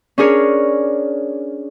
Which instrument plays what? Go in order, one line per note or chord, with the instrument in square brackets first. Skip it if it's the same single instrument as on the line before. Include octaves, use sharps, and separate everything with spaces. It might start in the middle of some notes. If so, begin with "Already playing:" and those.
[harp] C#4 D4 G#4 A#4 C#5